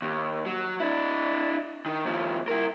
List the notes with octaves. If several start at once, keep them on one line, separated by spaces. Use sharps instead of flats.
D#2
F#3
D4 E4
D#3
D#2 F3
E4 A#4